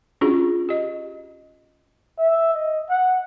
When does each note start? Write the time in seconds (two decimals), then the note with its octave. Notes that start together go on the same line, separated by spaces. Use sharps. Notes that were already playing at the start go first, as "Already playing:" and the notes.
0.21 C#4 D4 F4 F#4 G#4
0.69 G4 D#5
2.19 E5
2.54 D#5
2.90 F#5